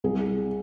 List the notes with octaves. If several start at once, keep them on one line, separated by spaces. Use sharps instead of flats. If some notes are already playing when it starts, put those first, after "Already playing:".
C2 G#4